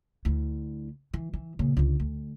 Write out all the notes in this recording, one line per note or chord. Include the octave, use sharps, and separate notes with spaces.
D2 E4
E3
E3
A#2 C#3
C#2 D3
D2